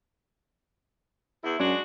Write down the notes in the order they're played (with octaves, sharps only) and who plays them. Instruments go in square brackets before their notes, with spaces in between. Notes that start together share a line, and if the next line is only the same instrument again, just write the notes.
[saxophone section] E2 E4
[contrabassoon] F#2 [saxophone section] G#3 D4 F#4